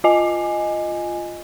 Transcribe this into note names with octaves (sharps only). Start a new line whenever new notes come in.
F4 D#5 G#5